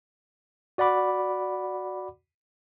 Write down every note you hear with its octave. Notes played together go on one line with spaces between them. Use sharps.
F#4 D5 F#5 B5 D6